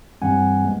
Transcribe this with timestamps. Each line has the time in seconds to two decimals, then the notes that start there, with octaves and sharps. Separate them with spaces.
0.21 G2 E3 G3 C4 F#5 G#5
0.65 G#3 B3